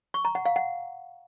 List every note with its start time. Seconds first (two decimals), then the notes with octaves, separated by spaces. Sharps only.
0.14 C#6
0.25 A#5
0.35 F#5
0.46 F5
0.56 F#5